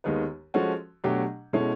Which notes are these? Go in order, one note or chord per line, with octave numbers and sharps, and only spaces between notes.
D#2 D#3 G#3 B3
F3 G#3 C#4 F#4 A4
B2 F#3 A3 D4 G4
B2 G#3 C#4 E4 A4